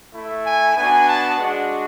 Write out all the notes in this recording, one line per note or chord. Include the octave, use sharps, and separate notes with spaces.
A3 E4
G#5
B3 D4 F#4 G#5
A5
G#3 D4 F#4 F#5